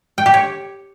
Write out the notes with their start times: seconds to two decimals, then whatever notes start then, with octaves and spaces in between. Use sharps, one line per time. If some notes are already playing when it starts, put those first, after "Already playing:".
0.18 G5
0.26 G4
0.34 C#5